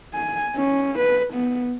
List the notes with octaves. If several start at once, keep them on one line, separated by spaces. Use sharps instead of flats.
G#5
C#4
B4
B3